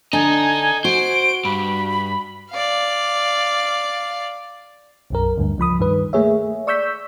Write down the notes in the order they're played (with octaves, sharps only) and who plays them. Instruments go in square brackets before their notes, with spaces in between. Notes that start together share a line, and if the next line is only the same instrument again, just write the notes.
[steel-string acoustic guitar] D3 D4 [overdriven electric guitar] D#5 A#5 [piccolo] G#5
[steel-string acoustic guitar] F#4 [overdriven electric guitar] C5 [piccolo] D7
[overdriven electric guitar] G2 [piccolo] B5
[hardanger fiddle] D5 F5
[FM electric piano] B1 F#2 A#4
D2 G2
C#2 F3 B5 D#6
G2 D#3 B4
A3 A#3 G#4 C#5 E5
D5 C#6 E6 G6 B6